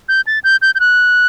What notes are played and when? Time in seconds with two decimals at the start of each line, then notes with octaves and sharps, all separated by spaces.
0.09 G6
0.27 A6
0.44 G6
0.62 G6
0.75 G6
0.80 F#6